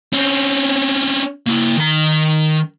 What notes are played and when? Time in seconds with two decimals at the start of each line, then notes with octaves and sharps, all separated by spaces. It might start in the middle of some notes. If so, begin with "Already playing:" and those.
0.13 C4 C#4
1.47 A#3 E4
1.78 D#3 A#5